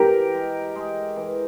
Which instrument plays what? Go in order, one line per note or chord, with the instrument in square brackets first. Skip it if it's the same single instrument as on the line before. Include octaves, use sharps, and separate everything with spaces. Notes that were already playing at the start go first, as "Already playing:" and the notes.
Already playing: [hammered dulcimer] E3 [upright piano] G4 A#4
[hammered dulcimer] G#3
G#3
E3